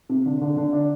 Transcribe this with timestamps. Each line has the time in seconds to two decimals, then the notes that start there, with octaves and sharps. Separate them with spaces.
0.09 C3
0.26 D3
0.41 D3
0.57 D3
0.73 D4